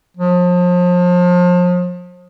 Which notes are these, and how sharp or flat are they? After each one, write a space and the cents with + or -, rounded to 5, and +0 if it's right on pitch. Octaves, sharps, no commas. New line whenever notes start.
F3 +35